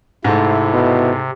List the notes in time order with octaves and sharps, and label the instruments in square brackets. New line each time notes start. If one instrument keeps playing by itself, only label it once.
[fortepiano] G#2 A3 [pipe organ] C3 [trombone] E4
[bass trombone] B2